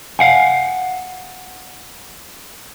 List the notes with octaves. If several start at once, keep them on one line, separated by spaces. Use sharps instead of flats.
F5 F#5 G#5